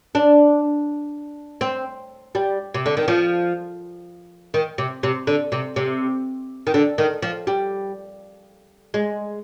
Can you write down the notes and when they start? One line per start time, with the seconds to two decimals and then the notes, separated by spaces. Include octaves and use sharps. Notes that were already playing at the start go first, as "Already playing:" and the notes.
0.15 D4
1.61 C4
2.35 G3
2.74 C3
2.86 D3
2.97 D#3
3.08 F3
4.54 D#3
4.78 C3
5.03 C3
5.27 D3
5.52 C3
5.76 C3
6.67 D#3
6.74 D3
6.98 D#3
7.22 F3
7.47 G3
8.94 G#3